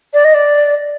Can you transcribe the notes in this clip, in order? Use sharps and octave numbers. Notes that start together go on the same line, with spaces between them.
D5
D#5
D5